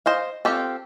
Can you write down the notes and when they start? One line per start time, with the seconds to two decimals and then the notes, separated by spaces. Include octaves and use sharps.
0.06 C5 D#5 F5
0.45 C4 F4 G4 A4